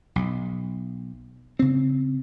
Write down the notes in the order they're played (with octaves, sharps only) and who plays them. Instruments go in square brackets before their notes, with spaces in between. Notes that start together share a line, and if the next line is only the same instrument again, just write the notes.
[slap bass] B1
C#3 C4